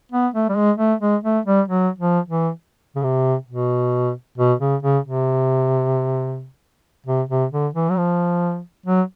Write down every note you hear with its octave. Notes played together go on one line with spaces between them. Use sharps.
B3
A3
G3
G#3
A3
G#3
A3
G3
F#3
F3
E3
C#3
C3
B2
B2
C#3
C#3
C3
C3
C3
D3
E3
F#3
F3
F#3